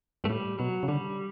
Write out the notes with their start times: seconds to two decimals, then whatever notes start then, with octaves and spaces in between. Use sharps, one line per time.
0.24 G2 A3
0.30 A2 G3
0.59 B2 F#3
0.83 C#3
0.88 D3 G3